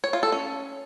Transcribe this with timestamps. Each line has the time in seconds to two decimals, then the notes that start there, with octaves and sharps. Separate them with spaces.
0.04 C#5
0.13 F4
0.23 A4
0.32 C#4